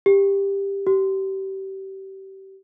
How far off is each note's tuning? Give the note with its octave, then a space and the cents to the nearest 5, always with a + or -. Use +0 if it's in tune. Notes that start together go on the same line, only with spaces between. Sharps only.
G4 +15
G4 -30